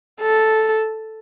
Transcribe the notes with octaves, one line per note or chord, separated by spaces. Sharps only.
A4